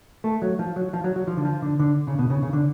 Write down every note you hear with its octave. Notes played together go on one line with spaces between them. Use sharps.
A3
F#3
F3
F#3
F3
F#3
F#3
F3
D3
F3
D3
D3
C#3
B2
C#3
C#3
D3